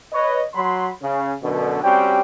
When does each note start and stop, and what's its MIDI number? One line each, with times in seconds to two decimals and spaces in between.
0.13 0.42 71
0.13 0.42 73
0.13 0.42 75
0.54 0.89 54
0.54 0.89 83
0.54 0.89 84
1.02 1.33 49
1.43 1.82 42
1.43 1.82 47
1.43 1.82 50
1.84 2.21 55
1.84 2.21 60
1.84 2.21 61
1.84 2.21 66
1.84 2.21 67
1.84 2.21 79